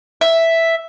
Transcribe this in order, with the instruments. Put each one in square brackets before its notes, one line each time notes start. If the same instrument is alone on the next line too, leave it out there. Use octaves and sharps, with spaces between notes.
[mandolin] E5